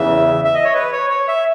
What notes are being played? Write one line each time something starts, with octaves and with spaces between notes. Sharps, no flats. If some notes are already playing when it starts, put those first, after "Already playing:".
Already playing: E2 C#3 E3 E5
E5
D#5
C#5
B4
C#5
C#5
E5